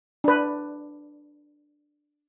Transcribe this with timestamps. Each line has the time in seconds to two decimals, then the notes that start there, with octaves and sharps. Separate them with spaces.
0.24 D4 B4